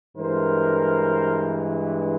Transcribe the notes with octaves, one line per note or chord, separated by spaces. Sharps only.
G2 E3 G#3 A#4 C5